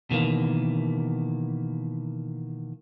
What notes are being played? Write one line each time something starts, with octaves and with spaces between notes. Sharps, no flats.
B2 D#3 E3 A#3